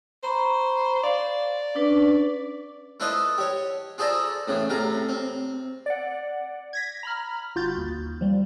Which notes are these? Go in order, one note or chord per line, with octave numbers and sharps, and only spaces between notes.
C5 A#5 B5 C#6
D5 F5
C#4 D4 B4
E4 F4 A4 B4 C5 D#5
G4 C#5
F4 G#4 A4 C5 D5 A#5
A2 C#3 E3
A2 C3 F5 A#5
C4
D5 F#5
G#6 A#6 B6
A#5 B5 F6
G1 F4 F#4 G6 A6
D#2
F3 G3